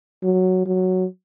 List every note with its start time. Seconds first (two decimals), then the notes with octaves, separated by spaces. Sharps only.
0.23 F#3
0.66 F#3